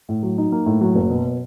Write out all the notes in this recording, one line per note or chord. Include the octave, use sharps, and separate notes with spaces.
A2
F#3
D#4
A#3
A2
F#3
F#1
B2